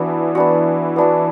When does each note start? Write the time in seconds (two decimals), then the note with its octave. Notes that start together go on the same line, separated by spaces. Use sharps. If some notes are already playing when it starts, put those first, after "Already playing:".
Already playing: E3 B3 D4 F#4
0.35 B3 D4 F#4
0.96 B3 D4 F#4